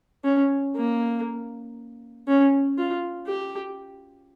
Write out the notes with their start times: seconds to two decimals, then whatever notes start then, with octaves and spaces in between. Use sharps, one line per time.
0.24 C#4
0.75 A#3
2.27 C#4
2.78 F4
3.27 G4